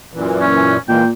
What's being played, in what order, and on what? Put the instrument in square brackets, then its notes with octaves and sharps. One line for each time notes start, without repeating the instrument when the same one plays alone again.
[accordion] F#2 A#2 E3
[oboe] C#4
[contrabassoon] A#2 [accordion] E3 G#3 A#3 [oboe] G5